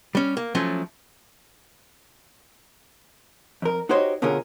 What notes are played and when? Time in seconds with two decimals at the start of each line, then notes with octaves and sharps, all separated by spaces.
0.15 G3 C#4
0.37 A#3
0.55 F3 F#3 A3 C#4
3.62 F2 A#4
3.89 D#4 F#4 G4 C5 C#5 D#5
4.22 B2 D3 C#4 F4 G#4 A#4